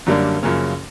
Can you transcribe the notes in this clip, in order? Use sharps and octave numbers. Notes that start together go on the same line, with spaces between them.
F#2 D3 G3 A#3 D4
F#2 C#3 F3 A#3 C#4